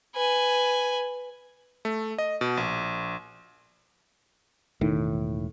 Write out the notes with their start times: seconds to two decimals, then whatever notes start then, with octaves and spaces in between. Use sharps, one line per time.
0.16 B4 G#5
1.85 A3
2.18 D#5
2.41 B2
2.57 A#1
4.81 E1 A2 D#3